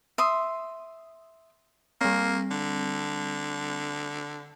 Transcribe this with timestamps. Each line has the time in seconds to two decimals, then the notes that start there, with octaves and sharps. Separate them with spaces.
0.18 E5 C6 D#6
2.01 G3 A#3 C4
2.51 D3